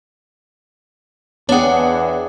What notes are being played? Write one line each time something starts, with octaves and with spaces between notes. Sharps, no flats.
E2 B3 D4 G#4 C#5 F#5 G5